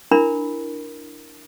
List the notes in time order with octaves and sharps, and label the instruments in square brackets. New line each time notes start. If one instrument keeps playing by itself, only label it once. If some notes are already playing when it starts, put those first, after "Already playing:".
[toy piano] D4 E4 A#4 B5